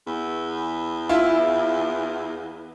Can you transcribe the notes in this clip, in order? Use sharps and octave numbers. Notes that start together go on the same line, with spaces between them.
E2
E4 F4